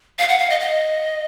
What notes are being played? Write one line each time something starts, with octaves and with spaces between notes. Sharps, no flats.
F5
F#5
F5
D#5
D#5